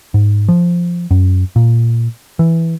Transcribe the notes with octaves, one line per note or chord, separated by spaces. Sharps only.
G#2
F3
F#2
A#2
E3